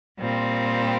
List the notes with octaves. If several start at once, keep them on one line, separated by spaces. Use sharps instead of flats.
A#2 G3 C4